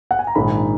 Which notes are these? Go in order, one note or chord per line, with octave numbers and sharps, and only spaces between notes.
F#5
G#5
A#5
A#1 G#2 D#3 B5